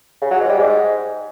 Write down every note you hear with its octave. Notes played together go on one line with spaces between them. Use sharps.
C#3
F#3
G#2
G3
G#2